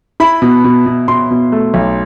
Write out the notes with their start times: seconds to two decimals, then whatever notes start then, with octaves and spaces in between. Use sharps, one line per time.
0.20 E4 B5
0.42 B2
0.64 B2
0.86 B2
1.08 B2 C6
1.31 B2
1.52 A3
1.74 B1